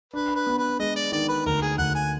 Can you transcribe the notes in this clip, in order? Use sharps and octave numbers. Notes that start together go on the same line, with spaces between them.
D4 B4
B4
B3
B4
G#3 D#5
D5
D#3 D5
B4
D2 A#4
G#4
D2 F#5
G#5